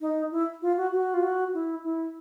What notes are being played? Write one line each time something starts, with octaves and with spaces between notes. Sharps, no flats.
D#4
E4
F4
F#4
F#4
F4
F#4
E4
E4